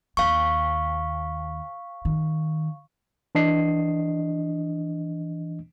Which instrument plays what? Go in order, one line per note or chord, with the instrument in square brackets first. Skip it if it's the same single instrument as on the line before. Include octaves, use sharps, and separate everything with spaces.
[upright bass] D#2 A#3 [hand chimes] F5 C#6
[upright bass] D#3
[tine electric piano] E3 D4 D#5 C7